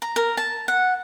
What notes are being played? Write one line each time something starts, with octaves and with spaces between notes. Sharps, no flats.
A#5
A#4
A5
F#5